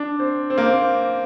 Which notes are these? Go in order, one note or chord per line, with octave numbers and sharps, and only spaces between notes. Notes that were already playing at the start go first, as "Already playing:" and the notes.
Already playing: D4
C4
C4
A#3
C4